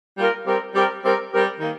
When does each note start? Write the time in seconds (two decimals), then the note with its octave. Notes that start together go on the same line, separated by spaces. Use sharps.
0.18 G3 A#3 F4 A#4
0.47 G3 C4 G4 A#4
0.75 G3 C4 G4 A#4
1.03 G3 C4 G4 A#4
1.32 G3 C4 G4 A#4
1.60 D#3 A#3